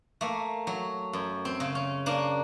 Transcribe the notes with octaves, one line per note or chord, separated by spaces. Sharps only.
A3 A#3
F#3
F#2
C4
C#3
C#4
A#3 D4